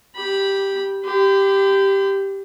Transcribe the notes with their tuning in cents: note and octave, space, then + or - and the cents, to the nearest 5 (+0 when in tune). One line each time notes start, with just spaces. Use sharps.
G4 +0 B5 -15
G4 +0 B5 +45